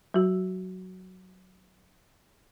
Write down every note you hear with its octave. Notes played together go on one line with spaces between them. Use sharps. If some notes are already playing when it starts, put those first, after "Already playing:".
F#3 F#4